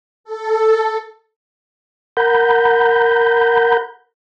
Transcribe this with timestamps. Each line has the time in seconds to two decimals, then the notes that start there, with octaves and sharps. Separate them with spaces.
0.24 A4
2.17 A#4 F#5 A#5 B5 G6